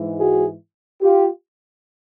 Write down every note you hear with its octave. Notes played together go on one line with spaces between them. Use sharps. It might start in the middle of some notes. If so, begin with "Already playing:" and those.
Already playing: G#2 E3 G#3
F#4 G#4
F4 G4